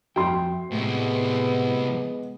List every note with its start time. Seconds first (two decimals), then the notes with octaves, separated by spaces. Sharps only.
0.16 F2 F#4 E5 G5 C6
0.71 C2 A2 G#3 B3